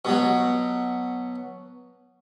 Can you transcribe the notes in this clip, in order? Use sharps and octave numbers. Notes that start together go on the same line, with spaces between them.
B2 F#3